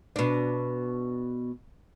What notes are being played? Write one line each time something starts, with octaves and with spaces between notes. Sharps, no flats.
B2 D4